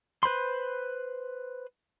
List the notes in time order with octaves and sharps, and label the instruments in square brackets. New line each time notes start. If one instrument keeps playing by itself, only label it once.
[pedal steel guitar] B4 C5 B5 C6